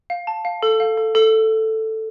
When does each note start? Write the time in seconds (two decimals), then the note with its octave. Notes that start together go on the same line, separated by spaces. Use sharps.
0.10 F5
0.27 A5
0.45 F5
0.63 A4
0.80 F5
0.98 A4
1.15 A4